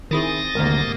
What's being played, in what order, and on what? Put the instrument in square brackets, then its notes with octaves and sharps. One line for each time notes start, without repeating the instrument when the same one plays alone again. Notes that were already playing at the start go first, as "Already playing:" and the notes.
[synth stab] D#3 E4 G#4 [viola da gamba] C4 [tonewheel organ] D#6 A6 A#6
[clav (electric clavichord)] G#1 D2 [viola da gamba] G#2 C3 A#3 [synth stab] A#4